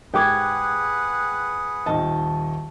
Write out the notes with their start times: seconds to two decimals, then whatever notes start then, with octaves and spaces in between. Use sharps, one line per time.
0.14 G#2 G4 G#4 B4 F#5 G5 D6 G#6
1.86 D#1 D#3 D#5 A5